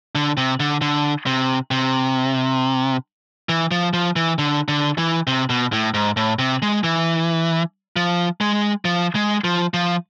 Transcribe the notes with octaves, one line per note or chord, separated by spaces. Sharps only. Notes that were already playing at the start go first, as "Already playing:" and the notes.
D3
C3
D3
D3
C3
C3
E3
F3
F3
E3
D3
D3
E3
C3
B2
A2
G#2
A2
C3
G#3
E3
F3
G#3
F3
G#3
F3
F3